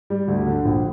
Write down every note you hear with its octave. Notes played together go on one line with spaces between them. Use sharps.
G3
D2
D3
A#1